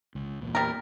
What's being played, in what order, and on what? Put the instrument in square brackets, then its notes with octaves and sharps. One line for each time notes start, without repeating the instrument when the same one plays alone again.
[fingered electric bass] C#2
E2 A#2
[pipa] G3 A#4